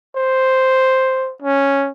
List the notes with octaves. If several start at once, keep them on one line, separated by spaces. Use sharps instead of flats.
C5
C#4